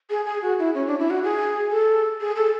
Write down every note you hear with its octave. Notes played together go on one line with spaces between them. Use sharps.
G#4
G#4
F#4
E4
C#4
D4
E4
F#4
G#4
A4
G#4
A4